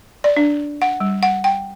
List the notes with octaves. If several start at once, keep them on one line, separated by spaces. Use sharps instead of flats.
D5
D4
F#5
G3
F#5
G5